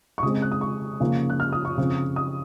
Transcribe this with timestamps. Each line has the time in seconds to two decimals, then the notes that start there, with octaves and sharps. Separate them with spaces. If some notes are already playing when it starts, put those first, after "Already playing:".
0.18 C#6
0.23 C#3 D#6
0.26 G#3 C4
0.42 F#6
0.52 D#6
0.61 C#6
1.00 C#3 F3 A#3 C#4
1.30 F#6
1.40 F6
1.53 D#6
1.65 C#6
1.78 C#3 F3 C4
2.16 D#6